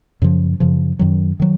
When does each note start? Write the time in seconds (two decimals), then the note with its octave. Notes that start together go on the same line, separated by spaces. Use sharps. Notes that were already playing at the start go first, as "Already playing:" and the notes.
0.22 F#2 C#3 F3
0.60 F#2 C#3 F3
0.99 F#2 D#3 F#3
1.40 D#3 F#3